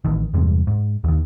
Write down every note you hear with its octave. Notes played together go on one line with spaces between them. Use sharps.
A1 D#3
E2 G2 C3 G#3
G#2
D#2 D#3